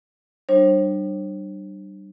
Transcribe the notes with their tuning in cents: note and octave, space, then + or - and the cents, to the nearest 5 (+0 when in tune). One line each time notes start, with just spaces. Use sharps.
G3 -25 D4 +35 C5 +40